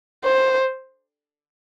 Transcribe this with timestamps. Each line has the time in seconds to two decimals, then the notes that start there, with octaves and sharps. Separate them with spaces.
0.24 C5